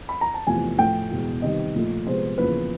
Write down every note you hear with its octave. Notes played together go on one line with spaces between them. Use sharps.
B5
A#5
A5
E2 C3 F3 A3 G#5
A2 F3 A3 G5
E2 B2 G#3
C3 D#3 G3 B3 D#5
A#2 F3 A3
C3 F3 G#3 B3 C5
E2 C#3 F3 A#3 B4